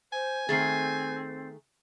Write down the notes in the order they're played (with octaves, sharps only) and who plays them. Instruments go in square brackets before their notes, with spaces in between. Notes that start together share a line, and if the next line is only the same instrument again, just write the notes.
[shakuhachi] C5 [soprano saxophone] G#5
[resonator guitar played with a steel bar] D#3 A3 G#4 [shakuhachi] C4 [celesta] A6 C7